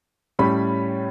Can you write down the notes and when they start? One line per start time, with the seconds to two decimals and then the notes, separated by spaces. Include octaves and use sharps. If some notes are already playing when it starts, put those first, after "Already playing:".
0.39 A2 G3 C#4 B5